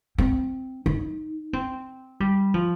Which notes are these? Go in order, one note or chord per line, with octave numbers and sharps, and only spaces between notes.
C4
D#4
C4
G3
F3